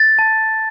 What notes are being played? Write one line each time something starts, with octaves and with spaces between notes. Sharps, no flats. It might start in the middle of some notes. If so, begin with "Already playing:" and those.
Already playing: A6
A5